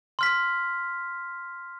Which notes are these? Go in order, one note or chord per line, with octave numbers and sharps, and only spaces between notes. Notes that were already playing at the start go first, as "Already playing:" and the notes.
C6 F6 B6